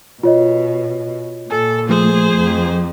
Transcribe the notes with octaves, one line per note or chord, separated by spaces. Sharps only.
B2 F4 C#5 D#5
A#2 A4 G#5
F3 A3 G#4 C5
F2